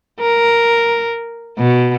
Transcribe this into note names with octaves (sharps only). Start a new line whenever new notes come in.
A#4
B2